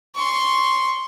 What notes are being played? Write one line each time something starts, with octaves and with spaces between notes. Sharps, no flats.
C6 C#6